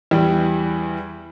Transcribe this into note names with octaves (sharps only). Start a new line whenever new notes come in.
E2 E3 G3